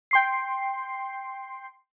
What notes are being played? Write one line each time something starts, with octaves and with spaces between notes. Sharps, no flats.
G5 C6 C7